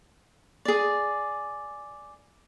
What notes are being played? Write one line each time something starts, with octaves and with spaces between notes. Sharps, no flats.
G#4 D5